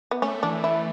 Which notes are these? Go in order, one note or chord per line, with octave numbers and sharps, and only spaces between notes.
B3
A3 C#4
E3 D4
E3 E4